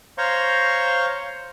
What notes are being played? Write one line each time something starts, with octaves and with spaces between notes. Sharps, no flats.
C5 C#5 F5 A#5 C6 C#6